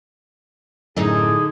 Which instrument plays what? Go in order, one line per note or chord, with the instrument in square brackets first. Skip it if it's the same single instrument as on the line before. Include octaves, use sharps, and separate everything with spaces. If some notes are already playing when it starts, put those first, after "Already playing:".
[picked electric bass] F#2 [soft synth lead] A2 [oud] D3 D#4 [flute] G#4